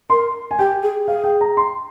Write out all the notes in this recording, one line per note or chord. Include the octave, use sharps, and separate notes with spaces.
A#4 C6
G#5
G4 G5
G#4
G#4 F5
G5
A#5
C6